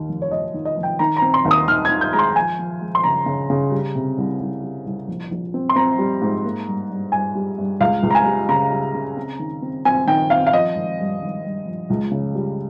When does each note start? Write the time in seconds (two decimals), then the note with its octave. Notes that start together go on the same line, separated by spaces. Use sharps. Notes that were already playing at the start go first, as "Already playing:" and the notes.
Already playing: D#2 D#3
0.09 F1
0.22 C#5
0.31 F1 D#5
0.54 D#3
0.65 D#5
0.77 F1
0.83 G5
0.99 D#3 A#5
1.17 A#5
1.22 C4
1.34 C6
1.45 D#2
1.51 D#6
1.68 D#3 F6
1.85 G#6
1.90 D#3
2.01 G6
2.13 G#3 A#5
2.19 C6
2.36 F3 G#5
2.59 F3
2.81 G#3
2.95 C6
3.04 C#3 A#5
3.26 C#3
3.50 C#3
3.72 G3
3.95 C3
4.18 C2
4.40 C2
4.63 G3
4.86 C2
5.08 A#1
5.31 A#1
5.54 C4
5.69 C6
5.76 C4 A#5
5.99 G3
6.22 G#2
6.44 A#3
6.67 G2
6.90 G2
7.12 G2 G#5
7.35 G3
7.58 G2
7.80 C#2 F5
8.03 C#2
8.11 A#5
8.15 G#5
8.25 G3
8.49 C#3 A#5
8.72 G3
8.94 C#3
9.16 C4
9.39 D#3
9.62 C4
9.85 C4 G#5
10.07 D#3 G5
10.30 C4 F5
10.47 F5
10.53 F3 D#5
10.76 G#1
10.99 G2
11.21 G#1
11.44 G2
11.66 F3
11.90 C#2
12.11 C#3
12.35 G3